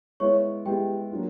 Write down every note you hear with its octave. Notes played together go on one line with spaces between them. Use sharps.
G#3 B3 E4 C#5 C#6
G#3 B3 E4 G4 G5
F#3 A#3 D4 F4